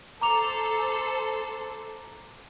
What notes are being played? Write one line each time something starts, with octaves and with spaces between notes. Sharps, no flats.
A4 C5 A#5 D6 F7